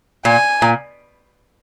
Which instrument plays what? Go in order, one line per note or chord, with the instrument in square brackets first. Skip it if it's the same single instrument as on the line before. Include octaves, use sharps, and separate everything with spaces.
[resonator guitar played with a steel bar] A#2 [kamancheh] G#5
[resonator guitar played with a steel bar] A#2